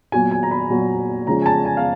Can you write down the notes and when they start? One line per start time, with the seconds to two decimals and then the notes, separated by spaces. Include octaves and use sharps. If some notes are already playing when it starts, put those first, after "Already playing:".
0.12 A#2 F#3 B3 G#5
0.31 G#5
0.43 A#5
0.51 B5
0.70 A#2 F#3 B3
1.27 C#3 F3 G#3 C#4 A#5
1.42 G#5
1.46 A5
1.65 G#5
1.77 F5